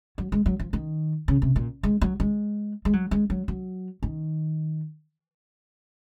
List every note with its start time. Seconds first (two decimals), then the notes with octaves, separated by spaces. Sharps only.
0.18 F#3
0.32 G#3
0.46 F#3
0.60 F3
0.73 D#3
1.28 C#3
1.42 C3
1.56 A#2
1.83 G#3
2.01 F#3
2.20 G#3
2.85 G#3
2.93 F#3
3.11 G#3
3.30 F#3
3.48 F#3
4.03 D#3